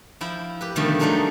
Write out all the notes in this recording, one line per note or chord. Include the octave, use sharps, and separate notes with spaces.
F3 E4 G5
G4 B4
B2 D3 D#3 F3 G3 A3
F#3 G3 A3 D4 D#4 G#4